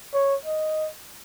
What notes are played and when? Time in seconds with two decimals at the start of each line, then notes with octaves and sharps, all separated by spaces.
0.14 C#5
0.45 D#5